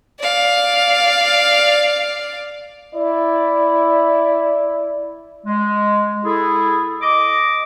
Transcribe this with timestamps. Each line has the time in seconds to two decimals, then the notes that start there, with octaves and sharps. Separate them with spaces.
0.20 D5 F5
2.94 E4 D5
5.46 G#3
6.25 E4 G#4 A4
7.02 D#5 D6